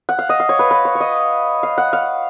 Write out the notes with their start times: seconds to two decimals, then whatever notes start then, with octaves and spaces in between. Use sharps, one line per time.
0.09 F#5
0.19 F5
0.29 D#5
0.40 F5
0.49 C#5
0.59 B4
0.71 B4
0.85 C#5
0.95 C#5
1.00 D#5
1.63 F5
1.78 F#5
1.93 F5